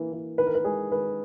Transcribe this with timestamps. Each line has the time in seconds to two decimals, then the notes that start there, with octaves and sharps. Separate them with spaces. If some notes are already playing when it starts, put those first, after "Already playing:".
Already playing: E3 A#3
0.13 E3
0.38 D#3 B4
0.47 A#4
0.55 B4
0.65 G#3 G#4
0.91 D#3 B4